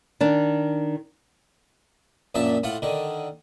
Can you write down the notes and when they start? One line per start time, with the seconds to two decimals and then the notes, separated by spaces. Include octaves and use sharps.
0.20 D#3 D4
2.35 A#1 F#2 A#2 E5 A5
2.63 A2 F4 F#5
2.82 D3 D#3